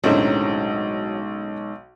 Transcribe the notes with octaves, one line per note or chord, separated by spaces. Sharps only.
B1 F#2 A2 D3 F#3 G#3 C4 D#4